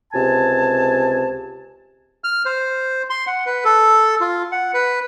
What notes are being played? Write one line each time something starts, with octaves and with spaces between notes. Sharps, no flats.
C#2 C3 G#5 A5
F6
C5
C6
F#5
B4
A4
F4
F#5
B4